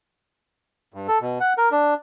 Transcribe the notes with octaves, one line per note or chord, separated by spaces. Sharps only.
G2
A4
B2
F#5
A#4
D4